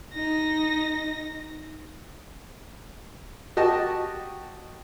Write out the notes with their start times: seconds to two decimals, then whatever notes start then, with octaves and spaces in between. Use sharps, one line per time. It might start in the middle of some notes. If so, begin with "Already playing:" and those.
0.14 D#4 A#6
3.57 F#4 G4 D#5 A5